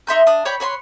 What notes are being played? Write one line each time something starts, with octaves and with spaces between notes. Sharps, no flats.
D#4 E5 C6 G6
D4 D#6
C#5 D5 G5 B5
B4 C#5 G#5 C6